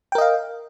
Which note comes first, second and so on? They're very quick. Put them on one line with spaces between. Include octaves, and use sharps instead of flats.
G5 A#4 D#5 F5